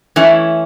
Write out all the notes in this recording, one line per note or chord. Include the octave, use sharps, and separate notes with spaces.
E3 A3 C#4 E4